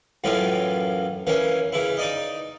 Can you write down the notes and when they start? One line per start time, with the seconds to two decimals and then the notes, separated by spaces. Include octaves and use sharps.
0.24 F#2 A2 E3 C#4 F4
1.27 E3 A#3 C#4
1.73 C#3 E3 E4
1.97 D#4 D5 D#5